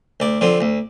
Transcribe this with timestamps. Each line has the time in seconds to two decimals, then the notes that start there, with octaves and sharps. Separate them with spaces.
0.20 D2 D5
0.41 D3 F3 C4
0.61 D2